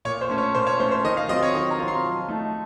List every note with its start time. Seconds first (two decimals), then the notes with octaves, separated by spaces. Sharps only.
0.05 A#2 C#5
0.21 C5
0.30 A3 C#4
0.38 C#5
0.55 A#2 C5
0.67 C#5
0.80 A3 C#4 C5
0.92 C5
1.04 D#3 D#5
1.17 F5
1.29 F#3 C4 F4 D#5
1.43 C#5
1.55 D#3 D#5
1.71 A#5
1.79 F#3 C4 F4
1.88 C6
2.04 F3
2.29 A3 D#4